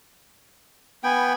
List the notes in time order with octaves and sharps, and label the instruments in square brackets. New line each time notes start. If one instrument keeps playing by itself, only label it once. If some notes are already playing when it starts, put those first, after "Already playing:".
[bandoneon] B3 G5 [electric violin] G#5 B5